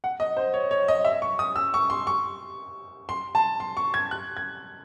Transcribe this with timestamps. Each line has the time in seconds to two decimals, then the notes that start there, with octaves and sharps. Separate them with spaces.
0.04 F#5
0.20 D#5
0.37 C5
0.54 C#5
0.71 C#5
0.88 D#5
1.05 E5
1.22 C#6
1.39 D#6
1.56 E6
1.74 C#6
1.90 C6
2.07 C#6
3.09 C6
3.35 A5
3.60 C6
3.77 C#6
3.94 G#6
4.11 F#6
4.37 G#6